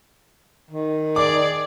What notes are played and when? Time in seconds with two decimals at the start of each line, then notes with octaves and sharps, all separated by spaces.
0.71 D#3
1.16 G#4 D5 D6